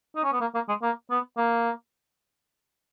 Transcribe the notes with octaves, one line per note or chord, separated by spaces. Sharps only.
D#4
C#4
B3
A#3
A#3
G#3
A#3
B3
A#3